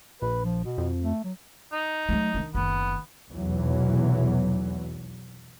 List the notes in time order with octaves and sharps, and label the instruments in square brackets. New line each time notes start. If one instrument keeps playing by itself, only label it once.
[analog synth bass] A#1 [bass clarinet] B4
[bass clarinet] F3
B2
[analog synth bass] F2
[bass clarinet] A3
F#3
[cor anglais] D#4
[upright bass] F#3 A3
D#3 D4
[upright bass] F#1 D#3 [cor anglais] B3
[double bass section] F1 B1 E2 E3 F#3